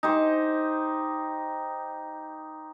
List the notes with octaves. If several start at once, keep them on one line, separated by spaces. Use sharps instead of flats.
D#4 G4 C5